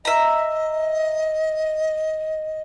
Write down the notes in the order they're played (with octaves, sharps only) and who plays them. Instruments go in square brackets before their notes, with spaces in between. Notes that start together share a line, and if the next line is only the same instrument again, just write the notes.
[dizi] D#5 [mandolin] E5 A#5